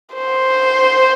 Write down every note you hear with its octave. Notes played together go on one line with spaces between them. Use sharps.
C5